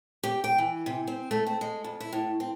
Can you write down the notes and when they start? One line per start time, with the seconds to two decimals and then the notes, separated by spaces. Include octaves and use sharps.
0.23 G4
0.44 G5
0.58 E3
0.86 C3
1.07 C4
1.31 A3
1.47 C4
1.61 G#3
1.84 F2
2.00 E4
2.13 A2
2.40 C4